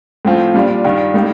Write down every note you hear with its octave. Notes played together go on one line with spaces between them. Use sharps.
A2 F3 C4 F4
A#2 G3 D4 F4
G2 D#3 G3 D4 F4
A2 G3 A#3 D#4